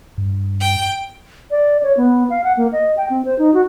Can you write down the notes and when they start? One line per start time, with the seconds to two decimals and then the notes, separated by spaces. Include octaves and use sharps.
0.18 G2
0.61 G5
1.51 D5
1.83 C#5
1.97 B3
2.30 F5
2.44 F#5
2.57 A#3
2.72 D#5
2.97 G5
3.10 C4
3.25 C5
3.38 D#4
3.54 F#4